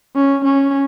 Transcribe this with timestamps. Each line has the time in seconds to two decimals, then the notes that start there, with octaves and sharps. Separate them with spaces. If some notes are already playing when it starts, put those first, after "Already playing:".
0.16 C#4
0.45 C#4